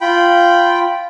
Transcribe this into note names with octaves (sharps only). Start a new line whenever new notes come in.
F4 G5 B5